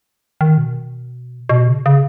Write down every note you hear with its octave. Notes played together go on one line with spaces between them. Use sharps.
D#3
B2
B2
C#3
C#3